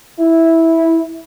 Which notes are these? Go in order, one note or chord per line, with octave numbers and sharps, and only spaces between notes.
E4